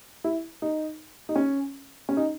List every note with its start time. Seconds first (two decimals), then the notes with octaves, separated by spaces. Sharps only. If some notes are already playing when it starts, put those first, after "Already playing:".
0.24 E4
0.62 D#4
1.29 D#4
1.36 C#4
2.09 C#4
2.17 D#4